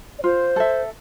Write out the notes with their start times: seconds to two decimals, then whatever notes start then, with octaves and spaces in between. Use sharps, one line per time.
0.19 D5
0.24 F4 C5
0.56 A4 E5